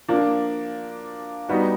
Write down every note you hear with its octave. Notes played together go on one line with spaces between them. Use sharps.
F3 A#3 D4
G3 B3 D#4 F#4